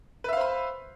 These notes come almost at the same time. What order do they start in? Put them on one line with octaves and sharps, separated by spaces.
B4 E5 F5 C5 B5